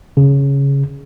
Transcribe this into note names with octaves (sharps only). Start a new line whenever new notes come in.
C#3